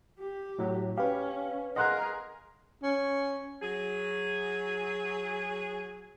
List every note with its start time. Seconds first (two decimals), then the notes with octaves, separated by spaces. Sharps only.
0.19 G4
0.58 A2 F#3
0.98 C#4 G4 B4 F5
1.76 G#4 A#4 D#5 F#5 C6 F#6
2.83 C#4
3.62 F#3 G#4